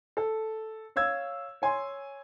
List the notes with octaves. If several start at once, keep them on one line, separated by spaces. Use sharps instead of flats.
A4
C#5 F5 E6 G#6
C#5 G#5 C6